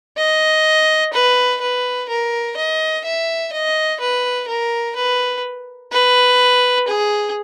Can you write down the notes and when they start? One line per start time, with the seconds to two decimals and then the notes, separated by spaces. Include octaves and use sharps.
0.17 D#5
1.13 B4
1.61 B4
2.09 A#4
2.57 D#5
3.05 E5
3.53 D#5
4.01 B4
4.48 A#4
4.96 B4
5.92 B4
6.88 G#4